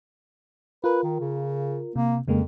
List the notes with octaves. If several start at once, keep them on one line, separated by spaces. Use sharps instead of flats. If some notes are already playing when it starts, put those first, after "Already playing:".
F4 A#4 B4
D#3
C#3
C3 A#3
F2 C#3 G#3 A#3